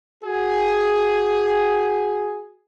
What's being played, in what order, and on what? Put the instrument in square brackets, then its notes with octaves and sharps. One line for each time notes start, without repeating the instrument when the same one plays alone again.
[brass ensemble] F#4 G#4